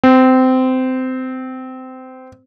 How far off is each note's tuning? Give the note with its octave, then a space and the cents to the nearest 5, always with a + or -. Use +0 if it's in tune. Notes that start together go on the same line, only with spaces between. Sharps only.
C4 -20